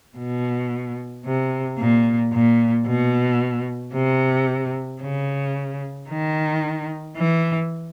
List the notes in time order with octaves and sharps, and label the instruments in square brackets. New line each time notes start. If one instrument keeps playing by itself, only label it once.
[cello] B2
C3
A#2
A#2
B2
C3
C#3
D#3
E3